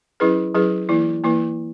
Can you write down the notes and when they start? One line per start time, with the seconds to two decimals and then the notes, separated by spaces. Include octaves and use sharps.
0.20 F#3 C#4 E4 G#4 B4
0.54 F#3 C#4 E4 G#4 B4
0.89 E3 A#3 E4 B4
1.24 E3 A#3 E4 B4